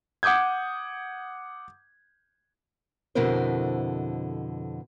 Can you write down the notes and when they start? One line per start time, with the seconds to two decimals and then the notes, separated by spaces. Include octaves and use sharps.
0.23 F#5 D6 D#6 G6 G#6
3.15 F2 B2 D3 E4 A#4 C5